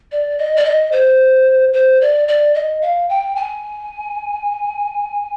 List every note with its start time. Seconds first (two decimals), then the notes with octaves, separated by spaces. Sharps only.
0.12 D5
0.39 D#5
0.56 D5
0.65 D#5
0.92 C5
1.73 C5
2.01 D5
2.28 D5
2.55 D#5
2.82 F5
3.09 G5
3.36 G#5